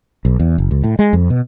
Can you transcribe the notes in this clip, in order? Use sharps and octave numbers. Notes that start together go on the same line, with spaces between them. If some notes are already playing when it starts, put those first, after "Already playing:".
B1
E2
F#1
C#2
A2
G#3
F2
B2